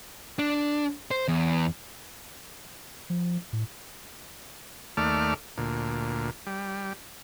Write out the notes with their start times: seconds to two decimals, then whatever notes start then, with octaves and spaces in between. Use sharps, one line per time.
0.39 D4
1.11 C5
1.28 E2
3.10 F3
3.53 A2
4.97 D#2 A3 D5 F6
5.58 D2 A#2
6.47 G3